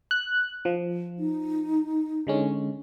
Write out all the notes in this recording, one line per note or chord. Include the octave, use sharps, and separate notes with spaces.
F#6
F3
D#4
D3 G#3 C#4